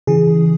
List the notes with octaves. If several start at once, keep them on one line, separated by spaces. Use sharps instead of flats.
C#3 E3 G#4